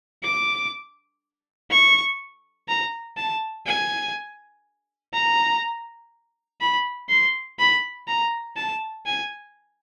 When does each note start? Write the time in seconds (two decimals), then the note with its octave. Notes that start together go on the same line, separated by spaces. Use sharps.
0.23 D6
1.71 C#6
2.68 A#5
3.17 A5
3.67 G#5
5.14 A#5
6.61 B5
7.10 C6
7.59 B5
8.08 A#5
8.57 A5
9.06 G#5